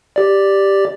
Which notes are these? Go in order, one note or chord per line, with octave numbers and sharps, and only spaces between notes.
G4 D5